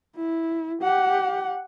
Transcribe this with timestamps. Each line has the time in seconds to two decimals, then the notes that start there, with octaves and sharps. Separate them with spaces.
0.16 E4
0.82 G4 F#5